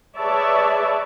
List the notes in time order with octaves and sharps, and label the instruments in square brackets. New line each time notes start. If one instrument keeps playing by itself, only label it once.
[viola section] G#4 B4 C#5 D5 E5 A5